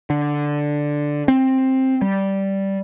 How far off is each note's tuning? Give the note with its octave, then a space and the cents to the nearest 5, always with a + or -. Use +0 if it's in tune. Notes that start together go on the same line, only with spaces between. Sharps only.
D3 +0
C4 +10
G3 -10